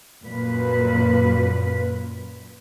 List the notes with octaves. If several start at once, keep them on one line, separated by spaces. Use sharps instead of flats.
F#2 A#2 B4